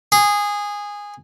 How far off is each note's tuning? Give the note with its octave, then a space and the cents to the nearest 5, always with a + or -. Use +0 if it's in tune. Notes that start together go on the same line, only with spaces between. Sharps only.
G#4 -15